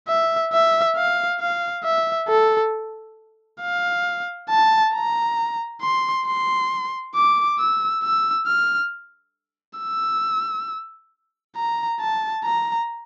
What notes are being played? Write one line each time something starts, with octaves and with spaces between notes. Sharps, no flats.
E5
E5
F5
F5
E5
A4
F5
A5
A#5
C6
C6
D6
E6
E6
F6
E6
A#5
A5
A#5